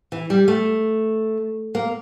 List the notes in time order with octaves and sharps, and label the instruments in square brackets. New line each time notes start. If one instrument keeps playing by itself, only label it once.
[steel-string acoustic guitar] E3
G3
A3
A#3